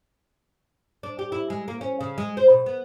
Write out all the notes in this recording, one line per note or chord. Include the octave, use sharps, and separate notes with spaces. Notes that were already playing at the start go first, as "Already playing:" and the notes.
D4
G4
E4
G#3
A#3
C#4
C#3
G#3
C5
B2
B3